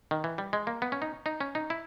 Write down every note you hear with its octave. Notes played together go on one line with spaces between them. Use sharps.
D#3
E3
G3
G#3
A#3
B3
C#4
D#4
D#4
C#4
D#4
E4